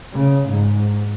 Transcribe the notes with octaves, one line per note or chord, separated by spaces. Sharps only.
C#3
G#2